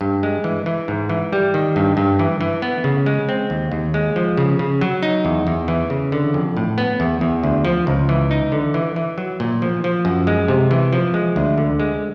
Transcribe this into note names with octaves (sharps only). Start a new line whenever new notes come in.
G2
G#3
E3
E3
G#2
E3
G3
D#3
G2
G2
E3
E3
B3
C#3
G#3
C4
D#2
D#2
G#3
F3
C#3
C#3
F#3
D#4
E2
E2
E3
C#3
D3
F2
A2
B3
E2
E2
D2
F3
C#2
E3
D#4
D3
E3
E3
F#3
A#2
F3
F3
F#2
G#3
C3
E3
F3
G#3
D2
D3
G#3